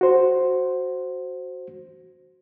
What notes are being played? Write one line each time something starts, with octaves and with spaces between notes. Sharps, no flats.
F#4 C5